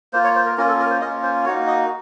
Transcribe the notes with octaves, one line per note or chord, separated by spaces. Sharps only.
A#3 F4 C5
C#5
C5
A#4
A#3 C#4 F4 A#4
A4
A#4
C5
A#3 C#4 F4 D#5
C5
A#3 D#4 F#4 C#5
D#5